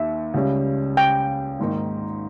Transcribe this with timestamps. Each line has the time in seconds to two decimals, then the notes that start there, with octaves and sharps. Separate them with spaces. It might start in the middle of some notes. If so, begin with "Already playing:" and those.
Already playing: D#2 D#3 E5
0.34 C#2 C#3 G3 C#4
0.97 G5
1.59 G#1 G#2 D#3 A#3 D#4